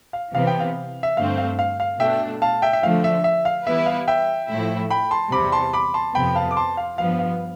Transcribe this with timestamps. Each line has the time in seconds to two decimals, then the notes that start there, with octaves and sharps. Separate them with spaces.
0.13 F5
0.34 C3 E3 B3 F5
0.47 G5
0.60 F5
1.03 E5
1.17 G2 D3 A3 C4 F5
1.38 F5
1.59 F5
1.80 F5
2.00 B2 A3 D4 E5 G5
2.42 F5 A5
2.62 E5 G5
2.73 E5
2.83 D3 F3 A3 F5
3.04 E5
3.24 E5
3.45 F5
3.66 E3 G3 B3 E4 B4 E5
3.86 F5
4.08 E5 G5
4.49 A2 F3 A3 E4
4.90 G5 B5
5.11 A5 C6
5.31 E2 C3 G3 B5 D6
5.52 A5 C6
5.73 B5 D6
5.94 A5 C6
6.15 F2 C3 F3 B3 G5 B5
6.36 F5 A5
6.51 D6
6.56 A5 C6
6.77 F5
6.98 G2 F3 B3 F5
7.19 F5